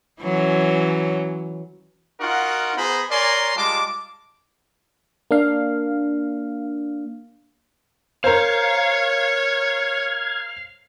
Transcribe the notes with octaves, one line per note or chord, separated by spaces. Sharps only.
E3 F#3 C#4
D#4 F4 F#4 A#4 F#5
B3 G#4 C5 A#5 B5
A#4 C#5 D5 G#5 A#5 C6
G3 G#3 F4 A5 D6
A#3 D4 F5
A#4 C5 C#5 F5 F6 G#6